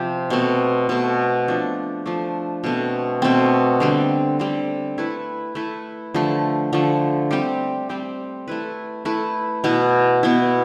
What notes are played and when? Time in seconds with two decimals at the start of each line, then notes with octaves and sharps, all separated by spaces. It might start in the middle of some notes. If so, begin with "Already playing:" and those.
Already playing: C3 F3 C4 G4
0.30 B2 A3 C4
0.89 B2 A3 C4
1.48 F3 A3 D4
2.06 F3 A3 D4
2.64 B2 A3 C4
3.22 B2 A3 C4
3.80 D3 G3 C4
4.39 D3 G3 C4
4.98 A3 E4 B4
5.55 A3 E4 B4
6.14 D3 F3 A3
6.73 D3 F3 A3
7.31 G3 C4 G4
7.89 G3 C4 G4
8.48 A3 E4 B4
9.05 A3 E4 B4
9.64 B2 B3 E4
10.23 B2 B3 E4